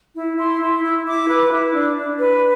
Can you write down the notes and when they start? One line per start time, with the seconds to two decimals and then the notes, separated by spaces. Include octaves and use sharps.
0.14 E4
0.37 E4 C6
0.60 E4
0.83 E4
1.05 E4 D6
1.29 B4
1.51 E4
1.74 D4
1.96 D4
2.19 B4